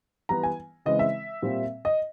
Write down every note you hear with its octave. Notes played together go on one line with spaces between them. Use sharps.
E3 G3 B3 A#5
G#5
C#3 E3 G#3 C4 D#5
E5
A#2 G3 C4
D#5